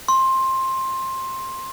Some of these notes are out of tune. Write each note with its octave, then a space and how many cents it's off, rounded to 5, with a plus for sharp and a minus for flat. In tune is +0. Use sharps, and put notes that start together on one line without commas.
C6 +15